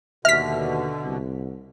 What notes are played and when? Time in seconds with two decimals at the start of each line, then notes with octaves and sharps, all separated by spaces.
0.25 D#2 B2 D3 E5 F6 B6
1.04 C2